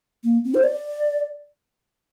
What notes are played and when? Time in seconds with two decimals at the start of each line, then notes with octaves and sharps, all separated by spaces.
0.24 A#3
0.45 C4
0.54 C5
0.63 D5